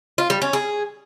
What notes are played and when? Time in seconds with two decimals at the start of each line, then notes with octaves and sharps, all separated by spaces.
0.18 F4
0.30 G3
0.42 C#4
0.53 G#4